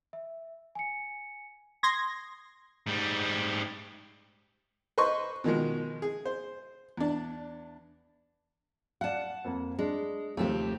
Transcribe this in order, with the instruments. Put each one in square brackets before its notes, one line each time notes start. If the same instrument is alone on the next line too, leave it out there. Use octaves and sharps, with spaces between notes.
[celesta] E5
G#5 C#7
[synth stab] C6 G#6 A#6 [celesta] D#6
[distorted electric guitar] G#2 G3
[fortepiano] B4 C5 D#5 C6 C#6
B2 D#3 F3 G#3
G#4
C5
E2 D4
[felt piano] D5 F5 [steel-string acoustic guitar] F#5 A5
[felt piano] F2 A#3
[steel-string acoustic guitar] G#3 [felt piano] D4
[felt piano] D#2 C3 F3 [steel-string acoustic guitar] A3 C4 G4